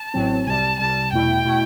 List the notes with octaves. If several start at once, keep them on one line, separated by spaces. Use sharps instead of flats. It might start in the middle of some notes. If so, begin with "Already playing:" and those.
Already playing: A5
A1 A2 F#3 C4
C2 C3 G3 A5
C2 C3 G3 A5
E2 B2 A3 E4 G5
B2 A3 E4